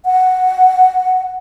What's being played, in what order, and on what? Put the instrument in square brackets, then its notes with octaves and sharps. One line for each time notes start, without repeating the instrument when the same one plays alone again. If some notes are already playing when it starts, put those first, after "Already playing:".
[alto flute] F#5